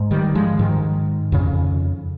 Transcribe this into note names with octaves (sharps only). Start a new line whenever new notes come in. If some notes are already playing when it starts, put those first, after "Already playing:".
Already playing: G#2
D#3 G3
F3 G#3
G#2 D#3
F2 C#3